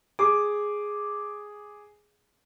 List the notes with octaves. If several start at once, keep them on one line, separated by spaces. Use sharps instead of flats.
G#4 D6